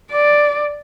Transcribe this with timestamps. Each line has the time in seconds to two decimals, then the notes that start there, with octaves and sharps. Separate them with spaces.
0.11 D5